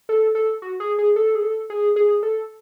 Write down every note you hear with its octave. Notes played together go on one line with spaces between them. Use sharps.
A4
A4
F#4
G#4
G#4
A4
G#4
A4
G#4
G#4
A4